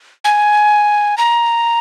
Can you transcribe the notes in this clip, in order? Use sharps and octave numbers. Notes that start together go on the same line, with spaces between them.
G#5
A#5